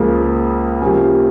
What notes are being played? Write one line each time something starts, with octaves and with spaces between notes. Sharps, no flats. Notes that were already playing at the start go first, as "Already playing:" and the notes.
Already playing: C#2 C#3 F3 A#3
C3 F3 A#3 C#4